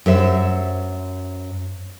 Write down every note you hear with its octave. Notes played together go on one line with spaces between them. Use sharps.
F#2 C5 E5